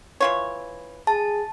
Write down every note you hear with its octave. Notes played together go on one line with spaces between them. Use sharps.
E3 F4 C#5
G#4 A5